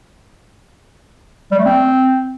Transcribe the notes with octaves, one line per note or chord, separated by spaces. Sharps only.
G3
A3
C4